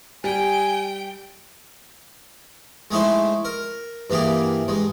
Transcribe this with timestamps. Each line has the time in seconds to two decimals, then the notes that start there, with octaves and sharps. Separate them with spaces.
0.24 G3 G5 G#5
2.91 G#3 A3 D#4 E4 C5
3.45 A#4
4.10 G2 E3 A#3 G4 G#4
4.68 G2 G#3